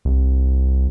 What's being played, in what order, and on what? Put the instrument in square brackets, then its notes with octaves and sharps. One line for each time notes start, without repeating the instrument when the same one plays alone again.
[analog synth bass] C2